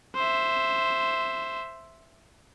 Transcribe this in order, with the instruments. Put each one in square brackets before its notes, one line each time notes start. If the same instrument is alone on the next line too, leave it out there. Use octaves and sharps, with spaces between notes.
[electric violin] C5 E5